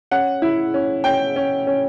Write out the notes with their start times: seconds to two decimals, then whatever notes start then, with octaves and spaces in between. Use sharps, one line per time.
0.11 C#4 F#5
0.42 E4
0.74 C#4
1.04 C#4 G5
1.36 C#4
1.67 C#4